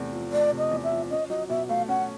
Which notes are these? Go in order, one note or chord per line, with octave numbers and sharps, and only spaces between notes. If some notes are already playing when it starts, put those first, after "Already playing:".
Already playing: E2 C3 A3
F3
A3 D5
C3
D#5
E2
E5
F3
C#4 D#5
F#3 D#5
B2 E5
A3 F5
C#4 F#5